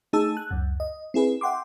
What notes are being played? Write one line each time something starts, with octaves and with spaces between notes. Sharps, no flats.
A3 D#4 G#4 A5 E6
F#6
C#2 F#2
D#5
C4 E4 G#4 B4
E5 F#5 G5 C6 D6